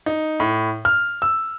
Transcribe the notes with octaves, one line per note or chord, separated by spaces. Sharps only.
D#4
A2
F6
E6